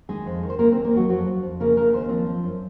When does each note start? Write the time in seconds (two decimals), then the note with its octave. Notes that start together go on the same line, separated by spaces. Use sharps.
0.09 D#3 G#3 G#4
0.26 F2
0.42 D#3
0.50 C5
0.59 C#3 A#3 A#4
0.72 C4 C5
0.76 D#2
0.84 A#3 A#4
0.93 D#2 F#3 F#4
1.09 F2 F#3 F#4
1.26 F2
1.43 F2
1.60 C#3 A#3 A#4
1.76 C#3 A#3 A#4
1.93 D#2 C5
2.09 F3 C4 C5
2.27 F3
2.44 F#2